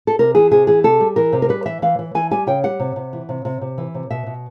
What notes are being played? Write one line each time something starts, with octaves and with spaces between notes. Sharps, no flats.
A4
C3 A#4
E3 G#4
C3 G#4
E3 G#4
C3 A4
G3
E3 A#4
C3
A#4
G3 B4
E3 E5
E3 F5
E3
E3 G#5
G3 G#5
C#3 G5
G3 F#5
C3
C3
E3
C3
C3
C3
E3
C3
B2 E5
B2